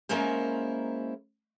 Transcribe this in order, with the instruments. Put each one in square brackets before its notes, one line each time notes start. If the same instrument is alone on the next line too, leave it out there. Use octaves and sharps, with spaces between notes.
[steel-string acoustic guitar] G#3 A#3 C#4 E4 A#4 C5